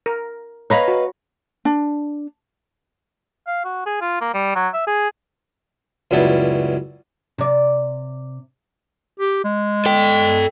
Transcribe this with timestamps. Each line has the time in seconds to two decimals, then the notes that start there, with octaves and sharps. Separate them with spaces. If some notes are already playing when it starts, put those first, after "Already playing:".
0.06 A#4
0.70 B4 C#5 D#5 F5 A#5 B5
0.88 F#4
1.65 D4
3.47 F5
3.65 F#4
3.86 G#4
4.01 F4
4.21 A#3
4.34 G3
4.55 F#3
4.74 E5
4.87 G#4
6.11 C#2 F#2 G3 B3 E4 A5
7.38 C3 D5
9.20 G4
9.44 G#3
9.86 A4 G5